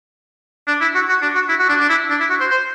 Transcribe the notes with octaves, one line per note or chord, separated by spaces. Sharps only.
D4
E4
F#4
F#4
D4
F#4
E4
F#4
D4
D4
E4
D4
E4
F#4
C5
C5